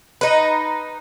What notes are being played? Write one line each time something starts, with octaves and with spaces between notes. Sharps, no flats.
D#4 B4